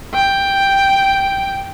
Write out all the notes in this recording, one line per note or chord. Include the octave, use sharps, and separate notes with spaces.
G5